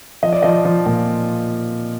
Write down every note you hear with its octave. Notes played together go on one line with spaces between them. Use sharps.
F3 D#5
D5
F3 D#5
F3
A#2